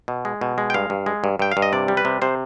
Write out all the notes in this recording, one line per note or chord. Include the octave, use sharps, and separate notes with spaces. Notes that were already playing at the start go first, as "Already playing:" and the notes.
B2
G#3
B2
G#3
G5
G2 F5
G2
G#3
G2
G2 G5
F5
G2
D#5
C3 D5
G3
B4
C3
C3 C5